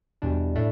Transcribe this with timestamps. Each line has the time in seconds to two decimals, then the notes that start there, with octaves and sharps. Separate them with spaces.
0.22 E2 B2 G3 D4
0.55 A2 A3 D4